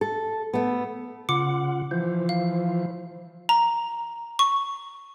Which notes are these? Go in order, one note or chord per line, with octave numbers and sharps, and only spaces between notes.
A4
A3 B3
C#3 F4 F#5 D6
E3 F3 C5
F5
A#5
C#6